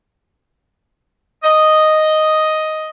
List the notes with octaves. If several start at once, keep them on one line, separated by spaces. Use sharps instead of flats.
D#5